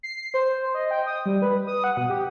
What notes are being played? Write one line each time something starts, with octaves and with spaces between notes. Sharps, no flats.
C7
C5
D#5
G5
D#6
G3
B4
D#6
F#5
B2
G4